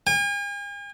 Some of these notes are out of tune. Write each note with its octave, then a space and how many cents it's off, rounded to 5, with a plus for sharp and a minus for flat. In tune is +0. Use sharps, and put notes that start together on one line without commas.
G#5 -45